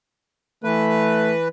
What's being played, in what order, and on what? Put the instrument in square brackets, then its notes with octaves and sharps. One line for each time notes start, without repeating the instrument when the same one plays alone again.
[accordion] E3 B4 [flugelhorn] A3